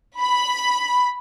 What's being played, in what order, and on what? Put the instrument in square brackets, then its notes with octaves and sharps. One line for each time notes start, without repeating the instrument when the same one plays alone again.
[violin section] B5